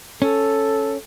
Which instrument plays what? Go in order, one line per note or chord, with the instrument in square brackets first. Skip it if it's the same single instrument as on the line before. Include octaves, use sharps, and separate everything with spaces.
[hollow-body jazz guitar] C#4 [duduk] A4